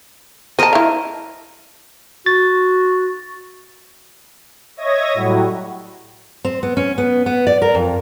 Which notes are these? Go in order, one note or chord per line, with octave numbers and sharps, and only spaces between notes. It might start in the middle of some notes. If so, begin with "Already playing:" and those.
A#4 C5 D#5 A5
E4 F5
F#4 A6
C#5 D#5 E5 D#6 G#6 A#6
A2 F#3 G3 E4 F#4
C4
B3
C#4
B3
B3
D5
A#4
F2